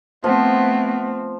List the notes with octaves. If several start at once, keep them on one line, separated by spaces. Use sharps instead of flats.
F3 A3 B3 C4